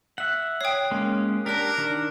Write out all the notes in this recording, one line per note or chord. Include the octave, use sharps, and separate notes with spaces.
E5 F#5 F#6
C#5 G5 D#6 C7
G#3 A#3 C#4
D4 G4 A#4 F#6 A#6
D#3 D4